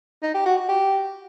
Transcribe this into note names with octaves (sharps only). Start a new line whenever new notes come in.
D#4
G4
F#4
F#4
G4